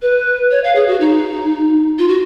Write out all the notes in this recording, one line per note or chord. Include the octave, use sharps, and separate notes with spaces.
B4
C#5
F5
G#4
F#4
D#4
F4
F#4